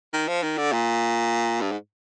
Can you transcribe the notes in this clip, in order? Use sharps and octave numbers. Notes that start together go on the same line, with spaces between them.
D#3
F3
D#3
D3
A#2
G2
G#2